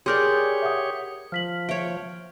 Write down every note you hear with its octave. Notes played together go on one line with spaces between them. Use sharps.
G4 G#4 A#4 C#5 D5 C6 D6 G6
E5 F#5 D#6
F3 F6 B6 F#7
C#5 E5 G5